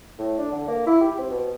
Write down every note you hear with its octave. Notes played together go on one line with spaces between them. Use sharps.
A2
D4
D3
A#3
E4
G4
C4
B2